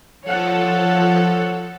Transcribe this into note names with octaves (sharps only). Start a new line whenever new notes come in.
F3 A4 C#5 F#5